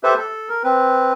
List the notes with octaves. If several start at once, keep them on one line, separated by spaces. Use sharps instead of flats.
G4 A4 B4 C5 E5
A4
A#4
C4 B4